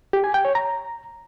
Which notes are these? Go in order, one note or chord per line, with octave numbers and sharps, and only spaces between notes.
G4
G#5
G5
C#5
A#5